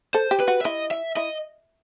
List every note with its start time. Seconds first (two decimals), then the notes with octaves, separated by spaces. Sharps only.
0.14 A4 C5
0.31 G4
0.40 B4
0.48 F#4
0.61 E5
0.65 E4 D#5
0.91 E5
1.16 E4 D#5